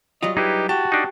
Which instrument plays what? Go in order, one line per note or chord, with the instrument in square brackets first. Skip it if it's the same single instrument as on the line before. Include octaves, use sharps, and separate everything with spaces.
[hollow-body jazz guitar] F#3 G3 F4 [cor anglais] D#5
[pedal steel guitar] D#4 B4 [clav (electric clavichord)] E4 G#4 [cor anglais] G4
[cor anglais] F#4 [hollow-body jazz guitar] G4 [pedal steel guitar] A5
[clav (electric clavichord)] D4 D#4